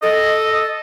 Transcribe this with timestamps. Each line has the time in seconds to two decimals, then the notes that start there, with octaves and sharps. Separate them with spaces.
0.02 A4 D#5